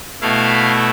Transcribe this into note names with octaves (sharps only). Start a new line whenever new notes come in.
B2 A3 E4 F5